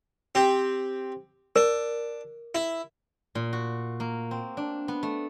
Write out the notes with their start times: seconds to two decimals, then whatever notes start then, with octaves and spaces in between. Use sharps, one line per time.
0.35 C4 G4
1.56 D4 A#4
2.55 E4
3.35 A#2
3.53 F#4
4.00 A#3
4.31 C4
4.57 D4
4.88 B3
5.03 A3